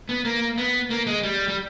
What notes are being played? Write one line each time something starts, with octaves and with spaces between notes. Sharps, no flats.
B3
A#3
B3
A#3
G#3
G3
G3